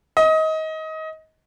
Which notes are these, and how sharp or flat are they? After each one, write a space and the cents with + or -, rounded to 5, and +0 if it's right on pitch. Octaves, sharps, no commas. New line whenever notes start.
D#5 +25